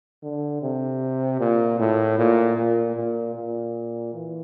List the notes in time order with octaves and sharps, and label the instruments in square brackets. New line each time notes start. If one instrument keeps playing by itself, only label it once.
[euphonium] D3
C3
A#2
A2
A#2
A#2
A#2
A#2
E3